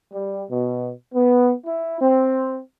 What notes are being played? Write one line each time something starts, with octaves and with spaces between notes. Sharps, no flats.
G3
B2
B3
E4
C4